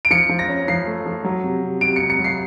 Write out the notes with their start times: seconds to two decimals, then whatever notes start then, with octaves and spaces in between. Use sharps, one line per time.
0.05 D7
0.10 F3 C#7
0.29 F3
0.39 A#6
0.49 C#4
0.68 F3 C7
0.86 A3
1.06 F3
1.24 F#3
1.43 C3
1.63 C3
1.81 C3 D7
1.96 C#7
2.01 C3
2.10 C#7
2.19 F#3
2.24 C7